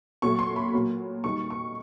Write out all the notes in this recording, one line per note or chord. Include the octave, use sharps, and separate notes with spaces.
A#2 F#3 A3 C#6
C6
B5
A#2 F#3 A#3
D#3 G3 A#3 C#6
C#6